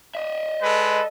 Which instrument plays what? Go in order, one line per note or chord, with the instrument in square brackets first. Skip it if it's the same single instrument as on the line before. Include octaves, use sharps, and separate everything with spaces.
[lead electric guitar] D#5 E5
[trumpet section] G#3 A4 B4